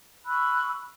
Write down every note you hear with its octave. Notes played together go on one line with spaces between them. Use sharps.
B5 C#6 E6 F#6